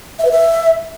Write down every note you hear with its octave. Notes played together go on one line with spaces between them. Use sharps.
E5
B4
E5